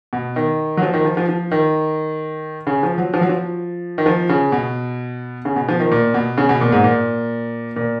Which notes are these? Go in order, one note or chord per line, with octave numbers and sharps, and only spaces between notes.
B2
D#3
F#3
F3
D#3
F3
F3
F3
D#3
C#3
F3
F#3
F3
F#3
F3
D#3
F3
C#3
B2
C#3
B2
F3
D#3
A#2
B2
C#3
B2
A#2
G#2
A#2
A#2